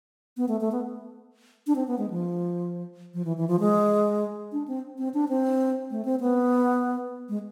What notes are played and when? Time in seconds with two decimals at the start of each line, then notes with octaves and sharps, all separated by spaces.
0.37 B3
0.48 A3
0.61 A3
0.72 B3
1.67 D4
1.76 C4
1.87 B3
1.98 G#3
2.10 F3
3.14 F3
3.25 E3
3.37 E3
3.48 F3
3.60 G#3
4.52 D4
4.68 C4
4.98 C4
5.14 D4
5.29 C4
5.91 A3
6.05 C4
6.20 B3
7.29 G#3